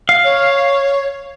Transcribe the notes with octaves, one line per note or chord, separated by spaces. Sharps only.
F5
C#5